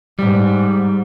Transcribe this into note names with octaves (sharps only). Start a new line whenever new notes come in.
G#2 G3